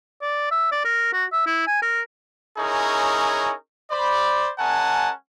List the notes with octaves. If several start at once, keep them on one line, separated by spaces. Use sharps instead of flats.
D5
E5
D5
A#4
F#4
E5
E4
G#5
A#4
C#4 D#4 E4 G#4 A#4 C#5
C5 D5 B5
G#3 C#4 A#4 F#5 G#5 A5